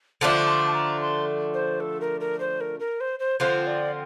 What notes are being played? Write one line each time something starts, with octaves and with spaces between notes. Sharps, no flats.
D3 F3 A3 D4 A5
C6
A5
A#5
C6
C5
A4
A#4
A#4
C5
A#4
A#4
C5
C5
D3 F3 C4 F4 C5
D5